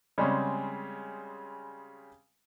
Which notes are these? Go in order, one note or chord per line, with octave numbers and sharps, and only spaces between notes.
C#3 G3 G#3 C4 C#4